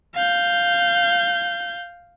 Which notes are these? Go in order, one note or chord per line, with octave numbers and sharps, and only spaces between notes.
F5 G6